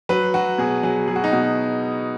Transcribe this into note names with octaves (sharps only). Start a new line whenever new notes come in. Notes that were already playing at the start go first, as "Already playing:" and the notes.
F#3 B4
F#3 F#4
B2 G#4
F#3 G#4
F#3 G#4
F#4
D#4
B2 F#4